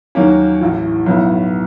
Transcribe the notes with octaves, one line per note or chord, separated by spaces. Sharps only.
D#2 D#3 F#3 A#3 C#4
A1 A2 E3
B1 A2 F#3 B3 E4